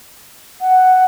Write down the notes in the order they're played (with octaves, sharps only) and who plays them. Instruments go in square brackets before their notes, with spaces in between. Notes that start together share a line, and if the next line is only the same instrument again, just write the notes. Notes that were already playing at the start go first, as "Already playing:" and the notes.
[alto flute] F#5